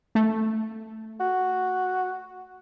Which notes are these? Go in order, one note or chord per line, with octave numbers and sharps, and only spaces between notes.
A3
F#4